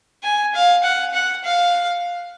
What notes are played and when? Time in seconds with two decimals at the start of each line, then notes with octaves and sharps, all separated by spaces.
0.23 G#5
0.54 F5
0.83 F#5
1.14 F#5
1.44 F5